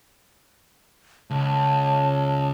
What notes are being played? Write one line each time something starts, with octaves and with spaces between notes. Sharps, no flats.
C#2 C#5 A5